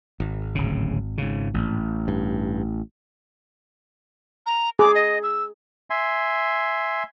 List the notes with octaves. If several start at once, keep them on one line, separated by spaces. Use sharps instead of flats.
G#1
D1 C#3
G#2 C#3
A1
G2
A#5
G#4 D6
D#5
E6
E5 G#5 C6